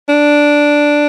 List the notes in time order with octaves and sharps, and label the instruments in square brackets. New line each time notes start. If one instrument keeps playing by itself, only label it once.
[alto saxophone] D4